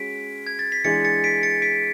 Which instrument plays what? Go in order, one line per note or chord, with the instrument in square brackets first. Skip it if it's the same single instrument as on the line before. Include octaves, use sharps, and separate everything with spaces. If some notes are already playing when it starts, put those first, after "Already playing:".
Already playing: [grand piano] G#3 C#4 F#4 [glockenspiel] B6 D7
[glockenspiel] G#6
A6
B6
[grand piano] E3 G#3 D4 G#4 [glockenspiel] A6 C#7
[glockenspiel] A6 C#7
B6 D7
A6 C#7
B6 D7